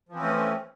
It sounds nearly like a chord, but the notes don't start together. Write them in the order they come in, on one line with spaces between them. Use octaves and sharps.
F3 E3 C4 C#4 A3